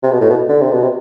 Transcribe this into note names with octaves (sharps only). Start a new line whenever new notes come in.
C3
B2
A2
B2
D3
C3
B2
C3